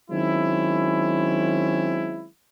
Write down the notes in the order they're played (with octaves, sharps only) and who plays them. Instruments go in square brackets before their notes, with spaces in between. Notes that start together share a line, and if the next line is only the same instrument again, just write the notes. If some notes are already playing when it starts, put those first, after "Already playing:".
[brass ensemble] D#3 F#3 G#3 C4 C#4 E4